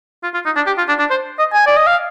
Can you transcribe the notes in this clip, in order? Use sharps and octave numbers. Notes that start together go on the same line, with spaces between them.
F4
F4
D#4
D4
G4
F4
D4
D4
C5
D#5
G#5
D5
D#5
F5